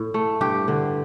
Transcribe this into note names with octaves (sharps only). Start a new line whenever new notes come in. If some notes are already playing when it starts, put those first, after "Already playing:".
Already playing: A2
A3
G2 G4
D3